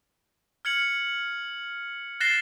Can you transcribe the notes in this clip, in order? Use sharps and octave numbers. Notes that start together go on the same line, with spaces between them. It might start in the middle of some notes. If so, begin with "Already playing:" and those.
F6 G#6 C#7 F#7
F#6 A6 A#6 C7 E7 G7